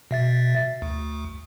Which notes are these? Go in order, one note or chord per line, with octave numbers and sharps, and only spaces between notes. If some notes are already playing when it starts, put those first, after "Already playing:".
B2 E5 A6
D2